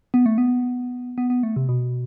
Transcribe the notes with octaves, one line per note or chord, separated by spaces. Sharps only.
B3
A3
B3
B3
B3
A3
C3
B2